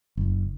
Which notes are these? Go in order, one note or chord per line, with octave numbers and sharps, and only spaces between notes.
F#1